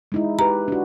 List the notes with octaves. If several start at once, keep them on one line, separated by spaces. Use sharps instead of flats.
G#3 D#4 E4
G4 B4 A#5
D4 F#4